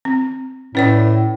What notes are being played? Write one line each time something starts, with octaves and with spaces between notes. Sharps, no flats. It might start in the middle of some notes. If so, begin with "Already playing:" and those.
C4
A2 C#4 B4 D5